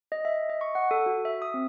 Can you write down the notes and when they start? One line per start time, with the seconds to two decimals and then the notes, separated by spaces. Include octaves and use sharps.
0.12 D#5
0.25 E5
0.50 D#5
0.61 C#6
0.75 F#5
0.91 A4
1.06 F#4
1.25 E5
1.42 D#6
1.54 C4